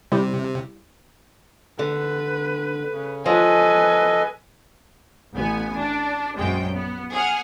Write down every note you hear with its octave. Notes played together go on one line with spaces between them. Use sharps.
C3 G3 E4 G4
D3 B4
C#3
F3 A4 B4 D#5 G#5
A1 B3 G#5
D4
A#1 F#2 G#3 G5
B3
G#4 F#5 F6